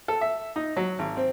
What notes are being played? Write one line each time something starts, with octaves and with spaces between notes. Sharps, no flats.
A4
E5
D#4
F#3
G#1
C4